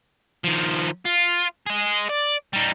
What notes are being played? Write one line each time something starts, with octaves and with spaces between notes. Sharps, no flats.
D#3 F3
F4
G#4 D#5
D5
G3 D#4